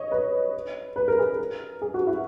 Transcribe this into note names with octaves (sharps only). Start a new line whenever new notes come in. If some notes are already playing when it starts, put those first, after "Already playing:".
Already playing: C#5 D#5
B4
B4
A#4
G#4
A#4
G#4
F#4
E4